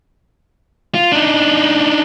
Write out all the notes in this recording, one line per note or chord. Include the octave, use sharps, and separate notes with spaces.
F4
D4 D#4